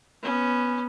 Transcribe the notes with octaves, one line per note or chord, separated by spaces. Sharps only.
B3 C#4